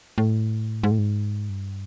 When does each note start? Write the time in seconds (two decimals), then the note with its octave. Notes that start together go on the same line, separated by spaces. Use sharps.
0.18 A2
0.83 G#2
0.91 A2
0.99 G#2
1.50 G2